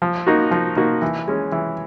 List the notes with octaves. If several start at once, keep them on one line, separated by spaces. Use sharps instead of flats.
F3
A#3 D#4 F#4
F3
A#3 D#4 F#4
E3
G#3 C#4
E3